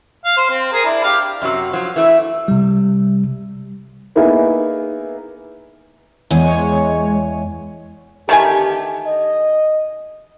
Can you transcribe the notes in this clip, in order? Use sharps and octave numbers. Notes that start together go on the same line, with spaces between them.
F5
C5
C4
G#4 A#4
D4 E4
G4 F5
F#2 C3 F#3
F3 F#3
E3 A3
C3 G3
A#3 B3 D#4 E4 G#4 A#4
E2 G#3 C#5 G#5
E2 D3 D#3 A3 G4 G#5
D#5